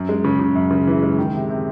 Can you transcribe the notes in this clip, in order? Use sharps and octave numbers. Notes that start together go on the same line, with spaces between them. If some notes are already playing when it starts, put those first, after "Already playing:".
Already playing: F#2
G#3
C#3
C#3
F#2
C#3
E3
G#3
D#3
C3
C3